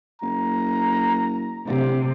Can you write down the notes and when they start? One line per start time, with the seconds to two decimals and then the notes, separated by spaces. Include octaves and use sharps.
0.22 F#1 A#5
1.67 D1 C3